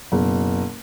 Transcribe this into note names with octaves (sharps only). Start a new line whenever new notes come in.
F#1 B2